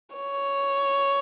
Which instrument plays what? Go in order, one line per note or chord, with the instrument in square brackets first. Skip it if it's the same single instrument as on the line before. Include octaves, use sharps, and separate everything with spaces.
[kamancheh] C#5